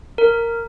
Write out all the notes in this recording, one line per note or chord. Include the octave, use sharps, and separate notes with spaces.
A#4